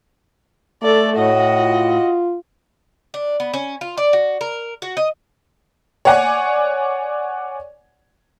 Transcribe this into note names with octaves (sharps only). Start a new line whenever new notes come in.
A3 A4 D5
A2 F#4 D#5
F4
D4
B3
C#4
F4
D5
F#4
A#4
F#4
D#5
C#5 D5 F#5 G#5